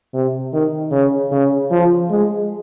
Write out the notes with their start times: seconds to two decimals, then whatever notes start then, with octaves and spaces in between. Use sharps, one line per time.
0.14 C3
0.53 D#3
0.91 C#3
1.32 C#3
1.71 F3
2.11 G#3